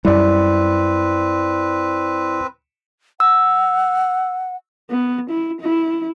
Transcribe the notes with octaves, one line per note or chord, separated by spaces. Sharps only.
F#2 G3 C4 E4 B4 D5
F#5 E6
B3
E4
E4